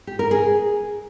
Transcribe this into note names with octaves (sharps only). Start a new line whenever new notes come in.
G4
A#4
G#4